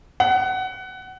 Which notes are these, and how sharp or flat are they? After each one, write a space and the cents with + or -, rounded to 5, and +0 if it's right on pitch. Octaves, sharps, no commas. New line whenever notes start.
F#5 +20